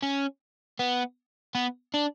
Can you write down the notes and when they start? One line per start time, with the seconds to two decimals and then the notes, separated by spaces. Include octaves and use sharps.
0.03 C#4
0.79 B3
1.55 B3
1.94 D4